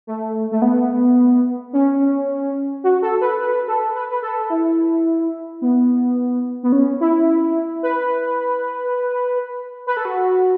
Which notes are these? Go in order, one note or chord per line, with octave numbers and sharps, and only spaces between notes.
A3
A3
B3
C#4
F#4
A4
B4
B4
A4
B4
B4
A4
E4
B3
B3
C#4
E4
B4
B4
A4
F#4